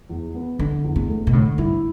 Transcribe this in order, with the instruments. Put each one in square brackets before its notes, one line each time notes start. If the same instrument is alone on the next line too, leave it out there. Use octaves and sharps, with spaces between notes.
[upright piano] E2
B3
[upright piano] D3 [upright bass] D4
[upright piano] E2
[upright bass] B3
[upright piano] A3
[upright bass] B2
[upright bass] A2 [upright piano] D3
[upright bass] G2 [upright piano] E4